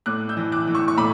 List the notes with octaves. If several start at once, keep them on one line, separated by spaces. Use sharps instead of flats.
A2 D6 F#6
E6 G6
E3
D6 F#6
E3
C#6 E6
C#6
A2 B5 D6